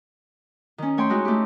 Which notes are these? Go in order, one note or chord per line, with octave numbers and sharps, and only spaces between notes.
D#3 C#4
A3 C#5 G5 C6
G#3 D#4 E4 F#4
A3 G4